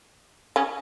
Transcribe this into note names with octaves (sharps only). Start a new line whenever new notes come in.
C#3 C#4